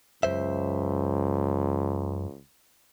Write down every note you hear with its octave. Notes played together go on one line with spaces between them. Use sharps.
C#2 F#2 C5 E5